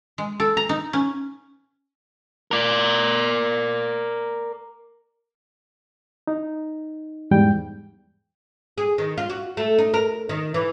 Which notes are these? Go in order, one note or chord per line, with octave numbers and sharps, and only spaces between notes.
G#3
A4
A#5
D#4
C#4
A#4 D5
D#4
E2 G#2 G3 G5
G#4
D#3
F4
F#4
A3
D#4
A#4
D#3
E3